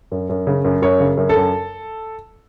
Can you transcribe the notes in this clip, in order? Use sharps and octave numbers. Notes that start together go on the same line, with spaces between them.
F#2
F#2
C#3
F#2
F#2 C#5
C#3
F#2
A4
F#2